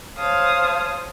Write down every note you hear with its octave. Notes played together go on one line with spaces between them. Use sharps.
C5 C#5 F5 A5 D#6